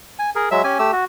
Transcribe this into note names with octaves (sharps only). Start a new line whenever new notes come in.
G#5
G#4 A#4
F#3 G#3 E5 E6
C#4 G4 G#5
A3 G4 E6
F#4